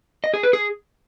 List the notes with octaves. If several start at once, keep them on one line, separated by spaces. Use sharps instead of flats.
D#5
G#4
B4
G#4